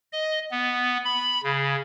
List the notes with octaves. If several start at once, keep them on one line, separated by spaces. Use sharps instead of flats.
D#5
B3
B5
C#3